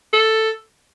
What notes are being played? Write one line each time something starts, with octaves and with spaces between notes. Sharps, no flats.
A4